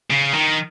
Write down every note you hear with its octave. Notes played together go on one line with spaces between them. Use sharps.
C#3
D#3